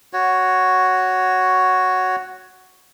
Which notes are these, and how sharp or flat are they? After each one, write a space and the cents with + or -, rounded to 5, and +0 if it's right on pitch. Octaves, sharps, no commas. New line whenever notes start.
F#4 +0 C#5 +0